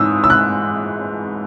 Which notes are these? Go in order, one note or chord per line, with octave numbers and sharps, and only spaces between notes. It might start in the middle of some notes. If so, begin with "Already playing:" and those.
Already playing: G#2 E3 G#3 D#4 D#6 E6
E6
F#6